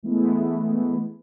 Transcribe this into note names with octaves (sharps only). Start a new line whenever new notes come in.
E3 G#3 A3 B3 E4